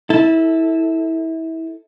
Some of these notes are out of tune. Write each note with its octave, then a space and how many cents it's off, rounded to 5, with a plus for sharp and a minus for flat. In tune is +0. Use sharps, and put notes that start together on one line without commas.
E4 -25 A4 +0